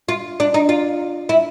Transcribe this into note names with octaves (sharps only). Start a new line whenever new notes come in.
F4
D4
D#4
F4
E4